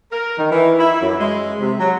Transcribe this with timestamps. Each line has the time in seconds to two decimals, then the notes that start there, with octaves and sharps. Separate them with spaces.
0.12 A#4
0.38 D#3
0.52 E3
0.79 E4
1.01 F#2
1.20 G#3
1.60 C3
1.79 F#3